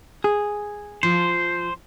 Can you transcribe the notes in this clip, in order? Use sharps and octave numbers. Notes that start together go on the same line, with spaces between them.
G#4
F3 C5